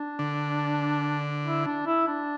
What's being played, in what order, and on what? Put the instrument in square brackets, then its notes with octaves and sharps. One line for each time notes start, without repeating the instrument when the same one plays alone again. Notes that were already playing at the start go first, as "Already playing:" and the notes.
Already playing: [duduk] D4
[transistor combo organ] D3
[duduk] E4
D4
E4
D4